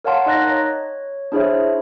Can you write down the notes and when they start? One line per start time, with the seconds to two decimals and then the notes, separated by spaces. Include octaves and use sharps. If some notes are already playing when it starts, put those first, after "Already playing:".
0.04 A#4 C#5 F5 F#5 A5 C6
0.26 D#4 D#5 F#6 A6 A#6
0.48 C#5
1.32 D4 E4 G#4 C5 C#5 E5